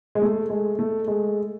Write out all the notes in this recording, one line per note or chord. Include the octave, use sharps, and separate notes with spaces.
G#3
A3
G#3
A3
G#3